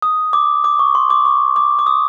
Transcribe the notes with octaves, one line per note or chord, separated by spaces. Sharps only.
D#6
D6
D6
C#6
C6
D6
C#6
D6
D6
D#6